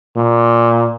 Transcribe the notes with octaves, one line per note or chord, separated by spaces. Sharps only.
A#2